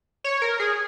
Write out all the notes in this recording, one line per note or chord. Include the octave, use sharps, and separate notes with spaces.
C#5
A#4
G#4